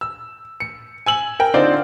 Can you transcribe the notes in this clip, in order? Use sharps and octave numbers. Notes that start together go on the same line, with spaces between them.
E6
C#7
G#5 E6 F#7
A#4 G5
D3 C4 D#4 F4 C5 D5